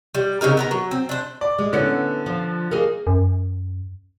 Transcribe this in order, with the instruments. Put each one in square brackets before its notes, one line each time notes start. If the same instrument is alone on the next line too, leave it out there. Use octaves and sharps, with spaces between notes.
[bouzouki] G3
C#3 C4 D#4 A#4
B3 A#4 A#5
F#3
C4
D4 C5
[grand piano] D5
[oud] G#3
[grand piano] D3 [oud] B3 C#4 E4
[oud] F3
A#3 D#4 G#4
[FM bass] F#2